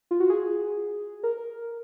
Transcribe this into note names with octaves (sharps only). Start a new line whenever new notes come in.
F4
F#4
G#4
A#4